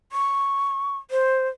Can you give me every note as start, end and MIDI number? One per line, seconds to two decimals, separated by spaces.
0.12 0.97 85
1.11 1.48 72